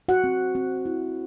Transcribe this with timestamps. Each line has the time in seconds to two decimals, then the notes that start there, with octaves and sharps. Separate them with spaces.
0.09 F#4 F#5
0.24 C4
0.55 C4
0.85 E4